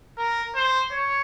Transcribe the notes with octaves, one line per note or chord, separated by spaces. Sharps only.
A#4
C5
C#5